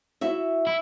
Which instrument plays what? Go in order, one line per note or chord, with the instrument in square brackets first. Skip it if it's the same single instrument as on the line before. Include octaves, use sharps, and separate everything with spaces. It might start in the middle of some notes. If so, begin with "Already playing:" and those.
[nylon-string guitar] E4 F#4 E5
[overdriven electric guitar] E4